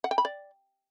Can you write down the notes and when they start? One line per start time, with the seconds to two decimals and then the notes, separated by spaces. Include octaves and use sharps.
0.04 F#5
0.11 G5
0.18 B5
0.25 D5